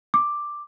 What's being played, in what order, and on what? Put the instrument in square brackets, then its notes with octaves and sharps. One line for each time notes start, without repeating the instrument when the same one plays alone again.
[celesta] D6